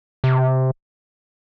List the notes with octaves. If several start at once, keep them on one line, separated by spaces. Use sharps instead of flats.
C3